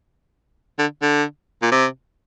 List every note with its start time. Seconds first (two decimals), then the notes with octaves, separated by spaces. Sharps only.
0.79 D3
1.02 D3
1.62 A#2
1.72 C3